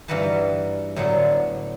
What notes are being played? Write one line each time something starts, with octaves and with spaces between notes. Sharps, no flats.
G2 E3 D#4 F#4 B4 A5
A2 D3 F#3 B3